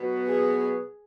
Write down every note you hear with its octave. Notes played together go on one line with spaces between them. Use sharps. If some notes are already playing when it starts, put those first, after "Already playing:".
Already playing: B2 F#3 B3 F#4 B4
G#4